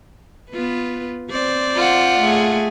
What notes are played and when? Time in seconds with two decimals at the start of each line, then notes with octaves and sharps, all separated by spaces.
0.52 B3 F4 B4
1.30 C4 C5 D5
1.76 F4 F#5
2.19 A3 G#4